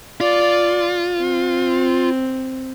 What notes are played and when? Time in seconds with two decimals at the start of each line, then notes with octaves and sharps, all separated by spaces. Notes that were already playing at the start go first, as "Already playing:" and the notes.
0.20 F4 D5
1.19 C4